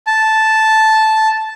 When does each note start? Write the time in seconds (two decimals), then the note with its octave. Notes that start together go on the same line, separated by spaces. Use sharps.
0.07 A5